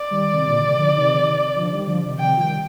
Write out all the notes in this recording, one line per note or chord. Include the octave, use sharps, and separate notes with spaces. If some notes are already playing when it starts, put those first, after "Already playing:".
Already playing: D5
D#3 G3
C3 D#3
A#2 D3
C3 D#3
D3 F3
C3 D#3
D3 F3
D#3 G3
D3 F3
C3 D#3
C3 D#3 G5
F3
D#3 G3